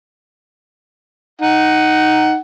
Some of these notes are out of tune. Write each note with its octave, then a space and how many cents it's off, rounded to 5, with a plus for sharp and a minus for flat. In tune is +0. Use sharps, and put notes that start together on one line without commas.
D#4 +0 F#5 +15